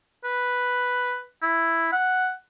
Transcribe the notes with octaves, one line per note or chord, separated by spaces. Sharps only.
B4
E4
F#5